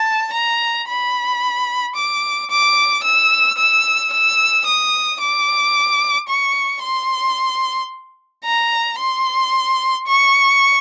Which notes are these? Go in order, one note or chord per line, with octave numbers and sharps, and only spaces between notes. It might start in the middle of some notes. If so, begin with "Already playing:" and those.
Already playing: A5
A#5
B5
D6
D6
E6
E6
E6
D#6
D6
C#6
C6
A#5
C6
C#6